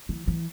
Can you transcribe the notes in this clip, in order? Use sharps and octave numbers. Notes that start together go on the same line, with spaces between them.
E3
E3